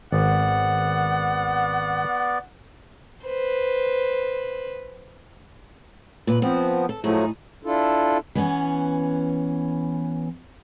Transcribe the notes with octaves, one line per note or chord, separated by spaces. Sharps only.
G#1 B3 D5 F#5
B4 C5
A#2 B4
F3 B3 C4
A4
A2 F3 F#3 A3 D#4 G#4
D4 E4 F4 A4
E3 B3 C#4